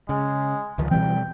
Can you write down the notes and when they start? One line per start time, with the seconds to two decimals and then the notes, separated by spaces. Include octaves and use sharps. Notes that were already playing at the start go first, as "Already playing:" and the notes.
0.09 C#3 G#3
0.78 C#2 D#3 F3
0.91 B2 E3 G3 C4 G5